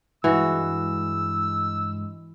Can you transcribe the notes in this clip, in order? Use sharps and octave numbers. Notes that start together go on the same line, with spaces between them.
G2 E3 G#3 F#4 E6